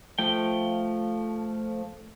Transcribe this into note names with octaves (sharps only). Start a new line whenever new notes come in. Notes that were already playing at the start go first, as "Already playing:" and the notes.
F3 A3 G5